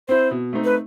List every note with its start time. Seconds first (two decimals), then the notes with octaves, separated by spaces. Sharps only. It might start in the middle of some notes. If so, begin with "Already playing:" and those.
0.08 C4 E4 C5
0.31 B2
0.53 A3 C4 D#4
0.65 B4